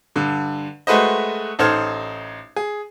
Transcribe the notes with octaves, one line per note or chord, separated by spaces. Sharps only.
G2 D3
G#3 A3 F#4 B4 C5 D#5
A1 D#4 A4 C5 F6 G#6
G#4